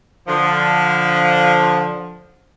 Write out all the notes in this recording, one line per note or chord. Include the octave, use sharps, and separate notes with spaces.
D3 F3